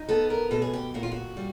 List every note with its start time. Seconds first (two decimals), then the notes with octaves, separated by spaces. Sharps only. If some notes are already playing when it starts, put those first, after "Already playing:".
Already playing: D#4
0.09 B3 A4
0.30 A#4
0.51 B2 A4
0.62 G#4
0.73 G4
0.94 A#2 F#4
1.03 F4
1.11 F#4
1.37 G3